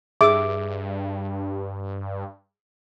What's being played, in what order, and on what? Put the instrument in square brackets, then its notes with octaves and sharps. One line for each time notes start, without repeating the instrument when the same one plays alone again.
[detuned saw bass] G2 [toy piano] G#4 E6 [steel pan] E5 D6